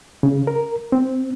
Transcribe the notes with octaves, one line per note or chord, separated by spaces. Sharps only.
C#3
A#4
C4